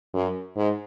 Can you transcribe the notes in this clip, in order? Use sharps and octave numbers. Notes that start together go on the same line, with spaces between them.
F#2
G#2